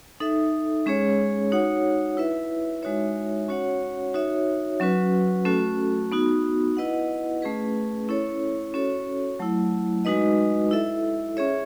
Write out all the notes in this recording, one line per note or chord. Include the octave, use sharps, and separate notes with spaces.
D#4 A4 E5
G#3 C#4 G#4 C#5
D#4 F#4 C#5 F#5
E4 B4 E5
G#3 D#4 F#4 C#5 E5
C#4 F#4 C#5 F#5
D#4 F#4 C#5 E5
F#3 C#4 F#4 B4
A3 C#4 F#4 A4
B3 D#4 F#4
E4 B4 D#5 F#5
A3 C#4 G#4 B4
C#4 E4 A4 C#5
C#4 F#4 A4 C#5
F#3 A3 E4
G#3 D#4 F#4 B4 D#5
E4 A4 E5
C#4 G#4 C#5 E5